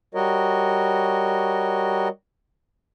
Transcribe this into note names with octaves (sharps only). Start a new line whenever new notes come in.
G3 F#4 A#4 C#5 D#5